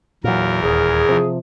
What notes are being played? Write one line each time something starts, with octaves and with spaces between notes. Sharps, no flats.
E2 A#2 F#3 A#4
D#1 G#4
C3 F3